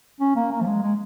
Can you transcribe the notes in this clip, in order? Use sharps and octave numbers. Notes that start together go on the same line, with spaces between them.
C#4
A#3
A#3
F3
G#3
G#3